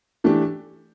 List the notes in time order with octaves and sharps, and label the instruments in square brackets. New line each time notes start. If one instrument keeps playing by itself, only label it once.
[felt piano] E3 A3 D4 G4